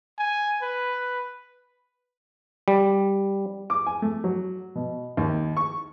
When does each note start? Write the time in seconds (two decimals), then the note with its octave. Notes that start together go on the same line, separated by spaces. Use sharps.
0.19 G#5
0.62 B4
2.68 G3
3.70 D6
3.86 G#5
4.02 A3
4.24 F#3
4.75 B2
5.17 D#2
5.57 C#6